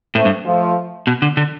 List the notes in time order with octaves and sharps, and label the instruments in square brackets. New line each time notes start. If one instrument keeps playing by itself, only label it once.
[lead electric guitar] A2 [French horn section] A3 C4
[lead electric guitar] G2
[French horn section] F3 A3
[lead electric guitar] B2
D3
D3